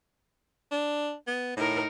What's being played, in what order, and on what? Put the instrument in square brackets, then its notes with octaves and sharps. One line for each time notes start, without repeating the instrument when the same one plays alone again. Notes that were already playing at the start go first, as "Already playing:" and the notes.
[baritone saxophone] D4
B3
[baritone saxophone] A2 [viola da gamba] D#4 A#4